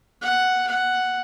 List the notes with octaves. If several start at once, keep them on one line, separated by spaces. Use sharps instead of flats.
F#5
F#5